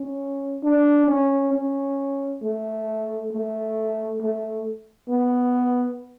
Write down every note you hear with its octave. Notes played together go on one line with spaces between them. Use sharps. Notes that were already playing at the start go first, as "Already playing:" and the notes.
Already playing: C#4
D4
C#4
C#4
A3
A3
A3
B3